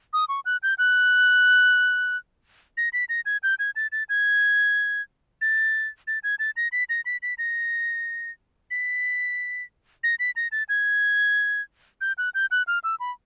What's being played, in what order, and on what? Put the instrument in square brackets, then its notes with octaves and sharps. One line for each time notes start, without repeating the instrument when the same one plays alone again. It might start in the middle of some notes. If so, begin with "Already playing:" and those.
[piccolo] D#6
C#6
F#6
G6
F#6
A#6
B6
A#6
G#6
G6
G#6
A6
A6
G#6
A6
A6
G#6
A6
A#6
B6
A#6
B6
B6
A#6
B6
A#6
B6
A#6
A6
G#6
G6
F#6
G6
F#6
F6
E6
B5